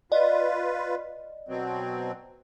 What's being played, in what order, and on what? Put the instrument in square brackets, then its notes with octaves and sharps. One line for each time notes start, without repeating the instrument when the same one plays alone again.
[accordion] F4 B4 [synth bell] D5 D#5
[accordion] B2 F#3 C4